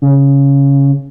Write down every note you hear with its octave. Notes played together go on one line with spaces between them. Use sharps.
C#3